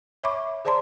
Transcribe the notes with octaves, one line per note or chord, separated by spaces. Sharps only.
C#5 E5 B5 C#6 D6
G#4 C5 D5 A5 A#5 C6